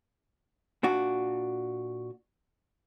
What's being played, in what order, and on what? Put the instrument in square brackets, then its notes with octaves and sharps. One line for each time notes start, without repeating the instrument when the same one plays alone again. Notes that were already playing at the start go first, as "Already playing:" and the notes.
[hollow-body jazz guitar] A#2 D4 F#4